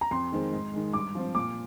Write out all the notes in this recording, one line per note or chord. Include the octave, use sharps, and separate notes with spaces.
A#5
F2 C6
D#3 G#3 C4
G#2
D#3 G#3
G2 D6
F3 C4
A#2 D6